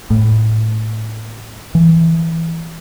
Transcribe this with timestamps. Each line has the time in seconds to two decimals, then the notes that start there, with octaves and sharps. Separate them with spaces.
0.10 A2
1.75 E3